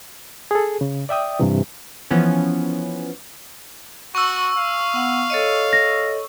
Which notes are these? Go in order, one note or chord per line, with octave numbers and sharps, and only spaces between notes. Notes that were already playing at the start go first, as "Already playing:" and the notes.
G#4 A4
C#3
D5 E5 G5 D#6
G2 C3 E3
E3 F3 B3 C#4
F#4 C#6 E6
F5
B3 F#5
A4 C#5 D#5
A#6